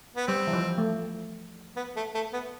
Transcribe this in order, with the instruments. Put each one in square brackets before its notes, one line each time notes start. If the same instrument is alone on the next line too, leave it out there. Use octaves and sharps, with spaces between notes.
[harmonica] B3
[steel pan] G3 [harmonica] C4
[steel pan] E3
F3
A3
[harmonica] B3
A3
A3
B3